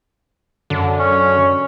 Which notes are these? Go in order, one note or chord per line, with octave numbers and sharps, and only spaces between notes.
F#2 D3
C#4